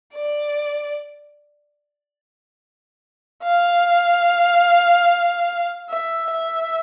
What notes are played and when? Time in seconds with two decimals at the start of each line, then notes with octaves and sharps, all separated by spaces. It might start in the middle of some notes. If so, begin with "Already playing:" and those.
0.14 D5
3.44 F5
5.90 E5
6.31 E5